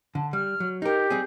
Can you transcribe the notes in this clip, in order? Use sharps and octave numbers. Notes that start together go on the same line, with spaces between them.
D3 A5
G3 F6
F#3
D#4 G4 A#4
G3 C4 G#4